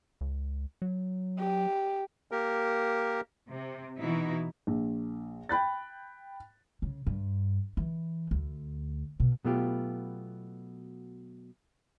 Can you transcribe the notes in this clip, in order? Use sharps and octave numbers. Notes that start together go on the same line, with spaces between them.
C#2
F#3
G4
A#3 G4 A#4
C3
B2 E3 D#4 E4 F#4
A#1
G5 B5 F#6 A6
C#3
G2
E3
D2
B2
B2 F#3 A3 B3 F4 G4